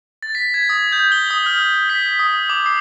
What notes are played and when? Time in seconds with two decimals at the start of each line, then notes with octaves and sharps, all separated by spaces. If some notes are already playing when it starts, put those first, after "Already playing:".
0.23 A6
0.35 B6
0.54 G#6
0.69 D#6
0.92 G6
1.12 G7
1.31 D#6
1.46 F6
1.90 B6
2.19 D#6
2.50 D6
2.66 C7